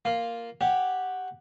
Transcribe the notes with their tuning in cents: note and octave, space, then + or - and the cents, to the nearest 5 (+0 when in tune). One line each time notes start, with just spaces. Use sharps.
A#3 +0 F4 +0
G4 +0 C#5 +0 F#5 +0